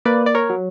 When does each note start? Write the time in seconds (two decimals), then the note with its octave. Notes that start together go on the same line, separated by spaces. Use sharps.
0.05 A#3 B4 D5
0.26 D5
0.35 A#4 C#5
0.50 F#3